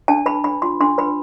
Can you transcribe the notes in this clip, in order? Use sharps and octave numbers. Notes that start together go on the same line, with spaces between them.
D4 A5
B4 B5
D4 B5
F4 C6
D4 C6
B4 B5